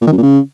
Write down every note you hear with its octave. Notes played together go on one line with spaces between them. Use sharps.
A#2
D#3
F#2
A#2
C#3